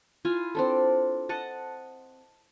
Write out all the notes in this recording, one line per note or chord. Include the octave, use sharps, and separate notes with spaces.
E4 F4 G#5
C4 D4 A4
D#5 F#5 A5